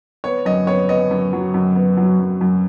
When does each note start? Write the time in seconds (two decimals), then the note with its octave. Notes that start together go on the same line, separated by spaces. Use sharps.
0.24 B3 C#5
0.45 F#2 D#5
0.67 B3 C#5
0.89 B3 D#5
1.11 F#2
1.33 F#3
1.54 F#2
1.75 B3
1.97 F#3
2.19 F#2
2.41 F#2